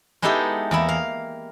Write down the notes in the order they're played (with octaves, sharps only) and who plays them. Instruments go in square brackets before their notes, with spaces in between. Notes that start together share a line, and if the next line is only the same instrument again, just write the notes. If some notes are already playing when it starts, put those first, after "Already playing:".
[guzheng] G#3 B3 D#4 E4 G4 A4
E2 A#3 E4
F5